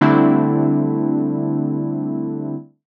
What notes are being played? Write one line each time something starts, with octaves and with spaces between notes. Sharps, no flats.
D3 G3 A3 C4 D4 E4